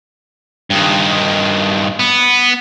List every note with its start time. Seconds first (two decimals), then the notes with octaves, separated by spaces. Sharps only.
0.70 G2 D#3
1.99 B3